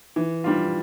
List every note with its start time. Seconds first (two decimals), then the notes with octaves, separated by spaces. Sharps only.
0.16 E3
0.44 G3 D4 F4